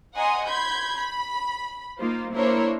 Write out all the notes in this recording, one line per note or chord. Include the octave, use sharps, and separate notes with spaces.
D#5 F#5 G#5 A#5 C6 D#6
B5 C6 G6 G#6
B5
A#3 D#4 F4 C5
A#3 D4 E4 A#4 C5 C#5